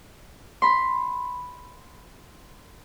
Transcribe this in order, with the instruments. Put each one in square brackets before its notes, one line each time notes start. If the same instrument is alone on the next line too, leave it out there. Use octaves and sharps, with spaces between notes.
[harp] B5 C6